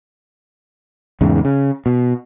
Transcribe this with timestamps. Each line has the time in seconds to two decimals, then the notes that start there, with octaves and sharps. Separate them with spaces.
1.21 E2 G#2 C#3
1.45 C#3
1.86 B2